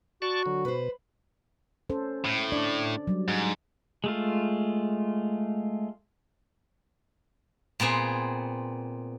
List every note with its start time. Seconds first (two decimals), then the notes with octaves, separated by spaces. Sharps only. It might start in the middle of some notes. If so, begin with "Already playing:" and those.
0.22 F#4 D5 A5 C#6
0.46 D3 F#3
0.65 B2 B4 C5
1.90 C#4 A4 C5
2.25 A2
2.52 D4 D5
3.07 F#3 G3
3.28 G#2
4.04 G#3 A3 F4
7.80 A#2 B3 C4 G#4